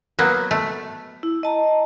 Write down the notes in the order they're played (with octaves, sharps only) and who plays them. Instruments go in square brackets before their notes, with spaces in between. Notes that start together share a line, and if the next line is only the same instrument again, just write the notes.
[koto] F#3 A#3 B3
A3
[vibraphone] E4
D#5 A5 A#5